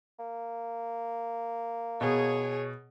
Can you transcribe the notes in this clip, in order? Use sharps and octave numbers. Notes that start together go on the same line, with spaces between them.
A#3
B2 G#4 C#5